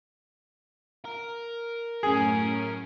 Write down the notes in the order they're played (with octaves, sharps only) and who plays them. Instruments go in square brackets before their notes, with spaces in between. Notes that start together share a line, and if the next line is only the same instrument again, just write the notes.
[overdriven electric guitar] A#4
[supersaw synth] F#2 A2 C#4 [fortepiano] G#4